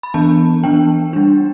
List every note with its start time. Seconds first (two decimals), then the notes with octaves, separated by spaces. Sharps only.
0.03 B5
0.14 E3 B3 D4 A5
0.63 E3 B3 D4 G5
1.13 G3 D4